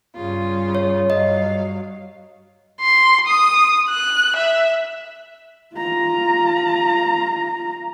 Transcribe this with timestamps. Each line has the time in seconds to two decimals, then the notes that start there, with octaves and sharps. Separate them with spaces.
0.15 G2 C#3 F4
0.75 C#5
1.10 G2 F#3 D#5 F5
2.81 C6
3.27 D#6
3.90 F#6
4.36 E5
5.75 F4 A#5